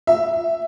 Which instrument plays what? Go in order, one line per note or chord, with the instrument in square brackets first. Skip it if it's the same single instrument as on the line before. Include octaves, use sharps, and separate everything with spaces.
[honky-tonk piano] E5